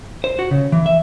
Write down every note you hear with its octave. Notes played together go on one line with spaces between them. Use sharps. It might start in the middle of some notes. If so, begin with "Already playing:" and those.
C5
F#4
C#3
E3
E5